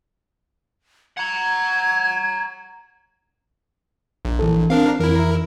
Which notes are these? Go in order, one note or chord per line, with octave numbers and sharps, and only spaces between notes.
F#5 A#5 G#6
A#1
E3 A4
C4 D4 A#4 F5
F2 E3 E4 A#4